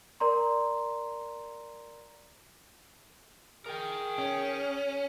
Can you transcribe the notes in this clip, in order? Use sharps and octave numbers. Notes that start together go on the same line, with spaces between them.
A#4 D5 A#5 C6
G#4 A#4 G5
C#4